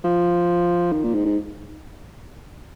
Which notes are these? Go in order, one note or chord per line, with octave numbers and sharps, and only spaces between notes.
F3
D#3
A#2
G#2
G#2